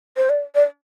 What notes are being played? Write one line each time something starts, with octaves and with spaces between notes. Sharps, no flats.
C5
D5
D5